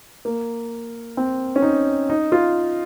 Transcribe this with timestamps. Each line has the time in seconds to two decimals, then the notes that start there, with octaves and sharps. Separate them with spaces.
0.25 A#3
1.17 C4
1.56 C#4
1.62 D#4
2.10 D#4
2.32 F4